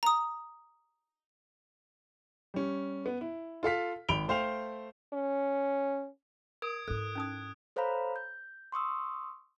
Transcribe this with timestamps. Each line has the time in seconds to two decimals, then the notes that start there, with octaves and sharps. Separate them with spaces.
0.03 A#5 D#6
2.54 G3 C#4
3.06 B3
3.21 E4
3.63 F4 A4 F5 B6
4.09 G#1 B5 D7 F7 G7
4.28 A3 C5 F5 G5 F7
5.14 C#4
6.62 A#4 D#6 G#6 D7
6.88 G#2 E4 A4 F#6
7.15 C#4 D#4 D#6
7.76 A4 C5 C#5 F5 A#5 B5
8.16 G6
8.72 C6 C#6 D#6 E6